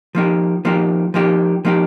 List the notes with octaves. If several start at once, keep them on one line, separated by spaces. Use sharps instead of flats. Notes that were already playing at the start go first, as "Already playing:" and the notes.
F3 A#3 D#4 G4
F3 A#3 D#4 G4
F3 A#3 D#4 G4
F3 A#3 D#4 G4